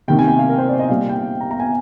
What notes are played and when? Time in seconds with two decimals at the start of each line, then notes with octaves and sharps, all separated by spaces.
0.08 C3 D#3 A#3 G5
0.19 G#5
0.28 G5
0.39 F5
0.49 A#4
0.58 C5
0.69 D5
0.79 D#5
0.89 A#2 G3 A#3 F5
1.09 G5
1.41 A#5
1.51 A#5
1.60 G#5